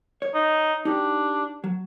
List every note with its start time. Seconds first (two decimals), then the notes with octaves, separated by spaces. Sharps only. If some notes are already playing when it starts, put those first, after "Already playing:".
0.22 C#5
0.35 D#4
0.85 D4 D#4 F#4 G4
1.64 F#3